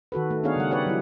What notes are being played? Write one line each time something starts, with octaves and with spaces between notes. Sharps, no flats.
D#3 F#4 A4 B4
A3
B3 D4 D#4 G#4 C#5 F5
C#3 G3 F#5
G4 B4 C#5 D5 F#5
F#3 E4